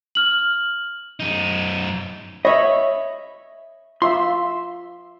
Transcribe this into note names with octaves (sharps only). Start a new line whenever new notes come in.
F6 F#7
F#2 D#4
C#5 D#5 E5 B5
F4 E5 C6